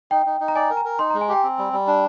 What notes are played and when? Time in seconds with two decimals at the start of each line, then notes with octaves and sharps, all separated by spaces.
0.11 D#4 G5
0.26 D#4
0.41 D#4
0.48 A#5
0.55 D5 G#5
0.70 A#4
0.77 A#5
0.85 A#4
0.99 D#4 C6
1.10 G#3 A#5
1.21 G#5
1.29 G4 G5
1.43 C4
1.58 G3
1.73 G3
1.87 D4